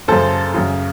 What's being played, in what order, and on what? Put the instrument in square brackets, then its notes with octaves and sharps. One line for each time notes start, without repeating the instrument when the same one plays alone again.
[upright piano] F#2 C#3 A4 C5
F#2 C#3